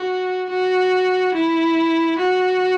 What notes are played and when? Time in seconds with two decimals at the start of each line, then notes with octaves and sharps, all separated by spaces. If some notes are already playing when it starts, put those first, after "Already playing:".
Already playing: F#4
0.50 F#4
1.34 E4
2.18 F#4